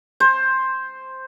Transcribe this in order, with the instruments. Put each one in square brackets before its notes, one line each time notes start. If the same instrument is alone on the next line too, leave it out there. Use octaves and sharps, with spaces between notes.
[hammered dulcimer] C5